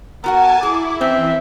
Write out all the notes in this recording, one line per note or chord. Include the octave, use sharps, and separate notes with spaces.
B3 F#4 A#4 F#5 G#5 A5
E4 G#4 D6
E3 C4 C#4 E5